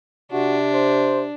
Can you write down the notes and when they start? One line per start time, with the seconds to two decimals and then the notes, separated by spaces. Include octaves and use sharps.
0.32 C3 D4 F#4
0.74 C5